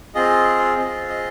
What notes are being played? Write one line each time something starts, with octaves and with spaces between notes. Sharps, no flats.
C4 F4 G#4 D#5
C4 F4 G#4 D#5
D#5